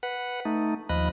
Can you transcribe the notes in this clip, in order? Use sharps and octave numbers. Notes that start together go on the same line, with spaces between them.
B4 F#5
A3 D#4
D#2 F3 D#5 B5 F#6